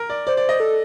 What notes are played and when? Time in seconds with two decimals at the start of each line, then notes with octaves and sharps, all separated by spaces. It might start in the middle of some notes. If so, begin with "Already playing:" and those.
Already playing: A#4
0.10 D5
0.27 C5 D5
0.37 D5
0.49 D#5
0.60 A4